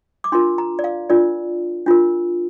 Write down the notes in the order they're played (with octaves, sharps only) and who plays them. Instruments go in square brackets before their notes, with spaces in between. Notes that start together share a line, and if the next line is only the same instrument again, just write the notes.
[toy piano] D6
D4 F4 A#4 C6
A#5
D5
F5
D4 F4 A#4 D5
D4 F4 A#4